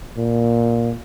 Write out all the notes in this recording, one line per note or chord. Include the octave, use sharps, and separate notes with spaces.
A#2